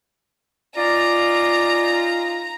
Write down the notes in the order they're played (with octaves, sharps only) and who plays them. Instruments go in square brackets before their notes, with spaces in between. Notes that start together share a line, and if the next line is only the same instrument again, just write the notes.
[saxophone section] C#4 D#4 F4 [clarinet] D5 [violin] A#5